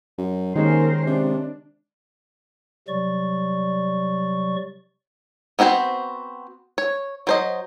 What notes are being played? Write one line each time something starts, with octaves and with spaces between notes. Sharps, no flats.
F#2
D#2 D#3 G#3 C#4 A#4 C5
C3 D4
C3 F#3 G3 D5 C#6
B3 C4 F#4 G#4 C5
C#5
F#3 C5 D#5